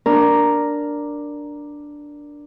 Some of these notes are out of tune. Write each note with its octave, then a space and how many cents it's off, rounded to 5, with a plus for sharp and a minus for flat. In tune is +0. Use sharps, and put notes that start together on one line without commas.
D4 +0 A#4 +0